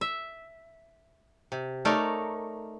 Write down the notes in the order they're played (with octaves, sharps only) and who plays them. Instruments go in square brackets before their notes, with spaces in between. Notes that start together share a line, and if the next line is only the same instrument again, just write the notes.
[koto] E5
C3
A3 D#4 A#4 C#5 D5